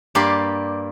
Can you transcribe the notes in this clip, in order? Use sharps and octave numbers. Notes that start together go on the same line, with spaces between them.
G2 A#3 G4 D5 C6